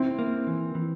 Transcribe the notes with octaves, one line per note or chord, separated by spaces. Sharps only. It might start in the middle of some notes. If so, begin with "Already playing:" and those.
Already playing: C4 E4
A#3
E3
E3